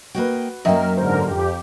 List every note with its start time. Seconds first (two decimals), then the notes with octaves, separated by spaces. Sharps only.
0.15 A#3 F#4 B4 D#5 G5
0.65 F#2 F#3 A#3 A#4 D#5 E5 G5
0.97 G#2 D3 A#4 C5
1.26 F2 G4